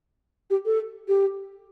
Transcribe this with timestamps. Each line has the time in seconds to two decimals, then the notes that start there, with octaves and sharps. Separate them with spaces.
0.50 G4
0.65 A4
1.08 G4